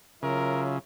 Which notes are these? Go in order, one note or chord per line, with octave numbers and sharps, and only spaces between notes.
C#3 F#3 F4 A#4 E5